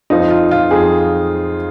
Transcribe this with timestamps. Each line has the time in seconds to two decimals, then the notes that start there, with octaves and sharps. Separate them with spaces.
0.10 F2 F3 D#4
0.30 F4
0.51 F4
0.71 F2 F3 G#4